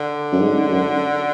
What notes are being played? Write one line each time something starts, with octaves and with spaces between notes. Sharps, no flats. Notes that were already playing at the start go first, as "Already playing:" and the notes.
Already playing: D3
F#2
G#2
F#2